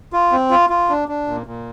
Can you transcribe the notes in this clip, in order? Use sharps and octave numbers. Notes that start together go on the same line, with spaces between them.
F4
C4
F4
F4
D4
D4
A#2
A#2